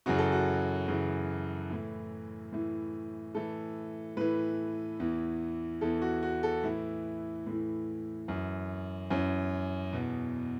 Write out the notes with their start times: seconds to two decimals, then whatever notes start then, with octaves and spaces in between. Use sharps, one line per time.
0.06 F#2 C#3 E3 F#4
0.18 A4
0.32 F#4
0.88 F#2 C#3 E3
1.70 A2 E3
2.53 A2 E3
3.35 A2 E3 A4
4.17 A2 E3 B4
5.00 E2 E3
5.81 E2 E3 A4
6.02 F#4
6.23 F#4
6.43 A4
6.63 A2 E3 E4
7.47 A2 E3
8.28 F#2 E3
9.10 F#2 E3 C#4
9.93 E2 B2